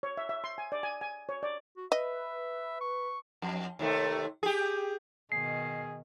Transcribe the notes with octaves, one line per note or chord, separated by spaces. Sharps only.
C#5
E5
E5
C6
G#5
D5
G#5
G#5
C#5
D5
F#4
B4 D#5 E5
C#6
F2
D#2 C3 A3
G4 G#4
B2 D#3 G#4 C7